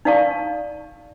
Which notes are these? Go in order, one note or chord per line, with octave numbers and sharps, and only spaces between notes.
D#4 D5 F5 A5 C#6